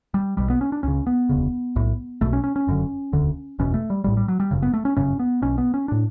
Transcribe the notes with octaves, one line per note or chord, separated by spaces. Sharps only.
G3
B1 B2 G3
B3
C#4
D4
C#2 C#3 C#4
B3
E1 D2 C#3
B1 A2
B1 B2 A3
C#4
C#4
C#4
F#1 F#2 D3
E1 D2 D3
F#1 E2 B2 C#4
A3
G3
A1 A2 G3
G3
F#3
G3
G1 F#2 C#3
B3
A3
C#4
G1 F#2 C#3 C#4
B3
B1 B2 C#4
B3
C#4
A2 D4